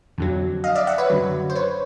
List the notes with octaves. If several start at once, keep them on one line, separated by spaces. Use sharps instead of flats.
F2 D3 F#3
D#5 F5
D5 E5
E5 F#5
B4 C#5
F#2 D3 F#3
C5
B4 C#5